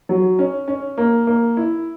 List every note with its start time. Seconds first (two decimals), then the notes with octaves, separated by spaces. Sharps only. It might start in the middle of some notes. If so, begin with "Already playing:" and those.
0.09 F#3
0.39 C#4
0.68 C#4
0.98 A#3
1.27 A#3
1.57 E4